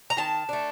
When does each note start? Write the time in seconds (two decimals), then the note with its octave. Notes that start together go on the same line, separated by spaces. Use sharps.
0.10 A#5
0.17 D#3 A5
0.49 A3 D4